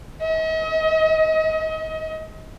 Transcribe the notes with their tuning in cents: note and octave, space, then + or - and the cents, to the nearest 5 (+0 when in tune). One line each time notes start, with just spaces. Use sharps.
D#5 +40